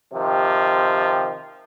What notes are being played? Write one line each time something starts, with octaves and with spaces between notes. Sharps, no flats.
C3 D#3 F3 G4